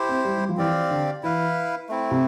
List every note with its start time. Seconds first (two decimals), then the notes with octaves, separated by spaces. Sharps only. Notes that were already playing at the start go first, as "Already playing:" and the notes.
Already playing: E4 G4 C5
0.09 C4
0.25 G3
0.37 G3
0.48 F3
0.57 E3 C4 G4 D5 F5
0.91 D3
1.23 E3 E4 B4 F5
1.89 A3 C4 E4
2.11 C3